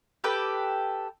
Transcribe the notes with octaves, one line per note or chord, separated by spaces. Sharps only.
G4 A4 B4 G5